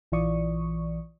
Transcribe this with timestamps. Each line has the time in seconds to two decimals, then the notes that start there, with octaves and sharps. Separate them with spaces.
0.12 A#1 E3 F4 D5 C#6 D#6